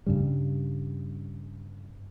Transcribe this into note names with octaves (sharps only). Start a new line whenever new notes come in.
G2 C#3 G3